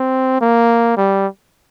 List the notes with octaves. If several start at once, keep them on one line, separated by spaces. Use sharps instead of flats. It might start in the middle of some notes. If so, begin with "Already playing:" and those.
Already playing: C4
A#3
G3